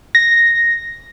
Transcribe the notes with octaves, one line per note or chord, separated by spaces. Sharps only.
A#6